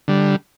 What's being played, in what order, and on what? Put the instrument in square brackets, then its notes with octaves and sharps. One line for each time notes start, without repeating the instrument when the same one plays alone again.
[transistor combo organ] D3 G3